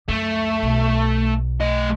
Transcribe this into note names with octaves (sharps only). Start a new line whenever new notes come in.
C#2 F#2 A3
B1
A3 D#5